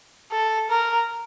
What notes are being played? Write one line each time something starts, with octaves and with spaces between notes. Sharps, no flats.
A4
A#4